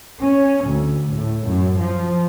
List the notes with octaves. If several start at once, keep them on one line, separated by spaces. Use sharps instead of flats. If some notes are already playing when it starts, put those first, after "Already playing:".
C#4
D2
A2
F#2
F3